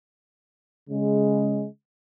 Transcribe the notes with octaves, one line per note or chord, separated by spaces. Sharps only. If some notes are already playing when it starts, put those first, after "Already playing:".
C#3 G#3